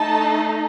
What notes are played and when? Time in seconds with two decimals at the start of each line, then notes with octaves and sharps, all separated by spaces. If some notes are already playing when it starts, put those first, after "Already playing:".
Already playing: A3 D#4 A4 A5